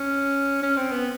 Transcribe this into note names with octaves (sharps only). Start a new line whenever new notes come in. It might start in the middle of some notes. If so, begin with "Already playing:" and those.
Already playing: C#4
C#4
C4
B3